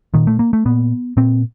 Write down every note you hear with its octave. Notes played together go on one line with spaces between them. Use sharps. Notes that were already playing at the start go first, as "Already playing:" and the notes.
A#2 D#3
A3
A#3
A3
A#2 B3
A#2 C4